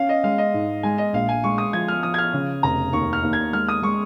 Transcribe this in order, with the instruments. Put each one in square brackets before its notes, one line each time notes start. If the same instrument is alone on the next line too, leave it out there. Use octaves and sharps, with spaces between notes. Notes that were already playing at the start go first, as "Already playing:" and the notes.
Already playing: [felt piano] C#4 [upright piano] F5
[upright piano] D#5
[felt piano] G#3 [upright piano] F5
[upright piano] D#5
[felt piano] G#2
[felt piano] G#3 [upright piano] G#5
[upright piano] D#5
[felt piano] A#1 [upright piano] F5
[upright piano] G#5
[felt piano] G#3 [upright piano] C#6
[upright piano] D#6
[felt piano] F3 [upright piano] G#6
[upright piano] F6
[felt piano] F3 [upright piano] D#6
[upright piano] G#6
F6
[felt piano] C#3
[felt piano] F1 [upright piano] A#5
[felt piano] D#2 [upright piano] C#6
[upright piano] F6
[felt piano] D#2
[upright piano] G#6
[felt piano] G#3 [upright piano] F6
[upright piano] D#6
[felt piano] G#3 [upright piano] C#6